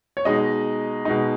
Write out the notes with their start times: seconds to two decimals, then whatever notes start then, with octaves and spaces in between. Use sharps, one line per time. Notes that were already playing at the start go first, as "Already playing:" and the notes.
0.17 C#5
0.25 B2 G#3 D#4 D#5
1.05 B2 G#3 D#4